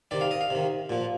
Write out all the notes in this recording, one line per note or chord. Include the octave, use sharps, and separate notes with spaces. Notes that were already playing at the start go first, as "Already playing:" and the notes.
C3 D#3 D5
F5
D#5
F5
C3 D#3
A#2 F3